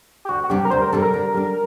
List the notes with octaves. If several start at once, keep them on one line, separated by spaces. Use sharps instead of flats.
G4
D2 F#4
F#4
C3 G3 D4 G4
A#4
D2 C5
A#4
C3 G3 D4 A4
A#4
D3
G3 D4